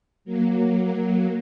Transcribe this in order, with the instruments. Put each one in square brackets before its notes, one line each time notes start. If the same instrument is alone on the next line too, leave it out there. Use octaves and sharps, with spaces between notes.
[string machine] F#3 A#3